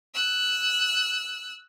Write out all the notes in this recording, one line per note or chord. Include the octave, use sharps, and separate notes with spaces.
E6 F#6